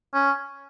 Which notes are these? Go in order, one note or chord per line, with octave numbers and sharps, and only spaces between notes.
C#4